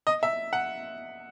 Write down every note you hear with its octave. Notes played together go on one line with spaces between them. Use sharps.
D#5
E5
F#5